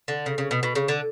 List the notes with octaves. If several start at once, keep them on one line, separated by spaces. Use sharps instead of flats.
D3
C#3
C#3
B2
B2
C#3
D3